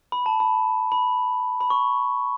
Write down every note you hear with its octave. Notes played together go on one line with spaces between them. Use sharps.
B5
A5
B5
B5
B5
C#6